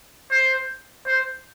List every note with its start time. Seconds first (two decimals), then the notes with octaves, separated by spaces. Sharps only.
0.31 C5
1.07 C5